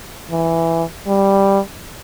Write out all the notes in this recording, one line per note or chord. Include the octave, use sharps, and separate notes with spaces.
E3
G3